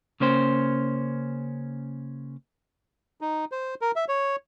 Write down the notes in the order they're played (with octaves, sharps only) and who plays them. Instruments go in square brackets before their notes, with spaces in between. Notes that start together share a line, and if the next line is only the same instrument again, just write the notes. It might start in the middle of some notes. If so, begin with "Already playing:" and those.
[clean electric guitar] C#3 A#3 C#4 C5
[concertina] D#4
C5
A#4
E5
C#5